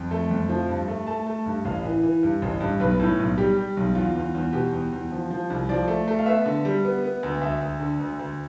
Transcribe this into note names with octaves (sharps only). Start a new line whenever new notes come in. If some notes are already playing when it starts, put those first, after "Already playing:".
Already playing: F2
A3
F2
F3
G2
A3
A3 A5
A3
G2
A1 F5
E3
E3
G2
A1
G2
B1 B4
A2
B1
G3 G4
G3
B1
E2 F4
E2
E2
B2 G4
E2
E2
F3
F3
C2
F3 D5
A3
A3
F5
B3 E5
D3
G3
B3
B3
D2
D2 E5
D2
D3
D2
D2